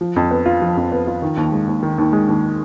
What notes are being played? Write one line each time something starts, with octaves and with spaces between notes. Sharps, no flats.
F3
F2
B3
F4
F3
F2
B3
F4
D#3
D#2
G#3
D#2
D#3
D#2
G#3
D#2